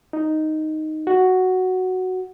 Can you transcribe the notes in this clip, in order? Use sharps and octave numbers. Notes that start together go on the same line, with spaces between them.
D#4
F#4